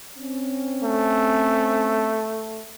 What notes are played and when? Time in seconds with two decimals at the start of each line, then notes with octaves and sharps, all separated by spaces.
0.17 C4 C#4
0.83 A3